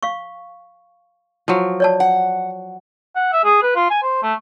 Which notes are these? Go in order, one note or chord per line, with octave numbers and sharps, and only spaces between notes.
F5 C#6
F3 F#3
C#5 D5 A5
F#5
F#5
E5
G#4
B4
F4
G#5
C5
A3